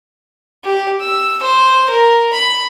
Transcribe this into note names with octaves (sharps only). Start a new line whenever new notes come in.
G4
E6
C5
A#4
B5